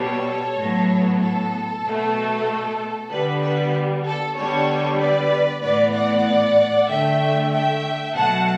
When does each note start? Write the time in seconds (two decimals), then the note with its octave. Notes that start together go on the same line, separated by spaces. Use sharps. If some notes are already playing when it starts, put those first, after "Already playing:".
Already playing: B2 G3 B3 A4 C#5
0.57 A2 F#3 B3
1.19 A4
1.84 B2 A3
3.10 D3 G3 B3 B4
3.41 B4
4.04 A4
4.35 D3 G3 B3 A4 C#5
4.99 B4 D5
5.61 A2 E3 B3 B4 D5
5.93 D5 F#5
6.88 D3 A3 E5 G5
7.52 E5 G5
8.15 B2 F#3 A3 F#5 A5